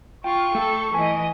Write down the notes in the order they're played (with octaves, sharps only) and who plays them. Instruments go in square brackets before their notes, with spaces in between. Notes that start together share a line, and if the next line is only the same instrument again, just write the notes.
[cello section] F4 [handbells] G5 [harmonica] C#6
[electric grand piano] A3 [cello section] A4
[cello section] E3 D#5 [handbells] G#5